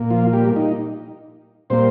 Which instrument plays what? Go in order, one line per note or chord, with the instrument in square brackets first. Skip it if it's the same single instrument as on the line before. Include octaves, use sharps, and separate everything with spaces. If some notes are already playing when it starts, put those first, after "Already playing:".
Already playing: [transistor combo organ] A#2 A#3
F3 F4
G3 G4
D#4
A#2 G3 A#3 C4 C5